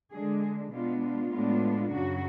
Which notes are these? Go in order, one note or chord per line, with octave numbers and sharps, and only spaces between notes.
D3 G#3 D4 G#4
B2 G#3 B3 D4 F4
F4
A2 G#3 B3 D4
F#2 C#3 F#3 F#4